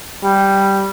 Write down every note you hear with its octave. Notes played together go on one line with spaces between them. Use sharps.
G3